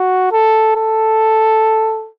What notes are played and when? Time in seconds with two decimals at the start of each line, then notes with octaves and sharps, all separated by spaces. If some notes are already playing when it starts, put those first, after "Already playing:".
Already playing: F#4
0.32 A4
0.76 A4